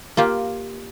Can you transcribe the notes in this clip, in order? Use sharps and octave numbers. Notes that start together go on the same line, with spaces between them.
A#3 F4 G4